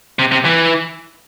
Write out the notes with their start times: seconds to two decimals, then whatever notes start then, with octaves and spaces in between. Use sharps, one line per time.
0.19 C3
0.32 C3
0.45 E3